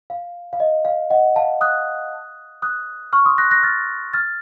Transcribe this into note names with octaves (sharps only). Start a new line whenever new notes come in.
F5
F5
D#5
F5
D#5 F#5
F5 A5
D#6 F#6
D#6 F#6
C#6 F6
C6 D#6
F#6 A#6
F#6 A#6
F6 A6
F6 A6